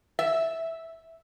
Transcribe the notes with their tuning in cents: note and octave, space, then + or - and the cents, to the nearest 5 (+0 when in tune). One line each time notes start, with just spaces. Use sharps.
E5 -10